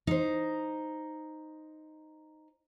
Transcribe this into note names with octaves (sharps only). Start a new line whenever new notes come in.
D#4 C5